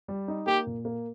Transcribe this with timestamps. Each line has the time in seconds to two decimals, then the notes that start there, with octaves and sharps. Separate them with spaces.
0.08 G3
0.28 D#4
0.47 A#3 G4
0.67 A#2
0.85 A#3